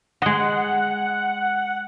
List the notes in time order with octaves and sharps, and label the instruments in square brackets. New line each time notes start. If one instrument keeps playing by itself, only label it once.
[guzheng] G#3 D#5 [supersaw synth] F#5